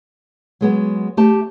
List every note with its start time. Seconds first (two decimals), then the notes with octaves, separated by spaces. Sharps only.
0.61 F#3 G#3 B3
1.17 A3 G4 A5